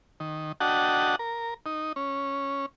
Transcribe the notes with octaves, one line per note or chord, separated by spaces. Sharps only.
D#3
D4 F#4 D#5 F#5 G5 A5
A#4
D#4
C#4